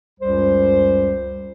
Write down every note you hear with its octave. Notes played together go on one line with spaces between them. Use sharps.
C#2 F#2 G3 C5